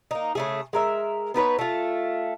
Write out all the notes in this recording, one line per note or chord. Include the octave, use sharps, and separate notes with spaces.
A#3 D#4
C#3 A3 G#4
G#3 A#4 E5
B3 D#4 B4 C#5
A3 F4